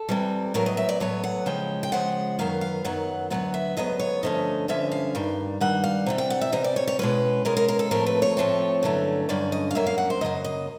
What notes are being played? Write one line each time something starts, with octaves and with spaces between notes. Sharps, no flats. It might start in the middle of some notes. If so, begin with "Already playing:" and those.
Already playing: A4
C3 E3 G3
A2 F#3 B3 A#4
D#5
E5
D5
A2 F#3 B3 C#5
F#5
C#3 F3 G#3 G5
G5
C#3 F3 G#3 F#5
F#2 D#3 F#3 B3 F5
F5
F#2 D#3 F#3 B3 F#5
D2 C#3 F#3 B3 F#5
E5
D2 C#3 F#3 B3 D#5
C#5
G2 D3 F3 A3 C#4 D#5
G2 D3 F3 C#4 E5
F5
G2 D#3 G3
G2 D#3 G3 F#5
F5
C3 E3 G3
G5
F#5
E5
C3 E3 G3 D#5
D5
C#5
C#5
B2 G#3 C#4 B4
B2 G#3 C#4 A#4
A#4
A#4
A4
A2 F3 A3 C4 A#4
B4
C#5
A2 F3 A3 C4
G2 D3 F#3 A3 C#4
G2 D3 F#3 C#4 D5
D#5
F5
F#2 C#3 F#3 A#3 E5
F5
F#5
C5
F#2 C#3 F#3 A#3 D#5
D#5